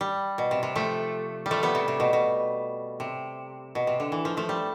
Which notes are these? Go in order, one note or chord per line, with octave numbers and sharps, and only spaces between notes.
G3
B2
C3
C3
F3 A3
G3
F3 A3
G3 B3
C3
C3
B2
B2
C3
B2
C3
D3
E3
F3
F3 A3
G3